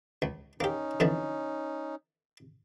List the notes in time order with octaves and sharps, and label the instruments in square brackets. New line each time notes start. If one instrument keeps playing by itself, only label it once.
[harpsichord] C#2
[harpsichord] A#3 G4 [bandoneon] C#4 D#4
[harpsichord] F2 D3 E3